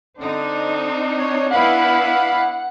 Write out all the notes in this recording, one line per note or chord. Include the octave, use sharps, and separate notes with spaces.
D3 C4 D4 D#4
C#5
B3 E4 B4 F5 F#5 B5